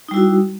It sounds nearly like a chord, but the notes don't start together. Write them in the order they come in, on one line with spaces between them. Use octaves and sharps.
D#4 G3 E4 F#4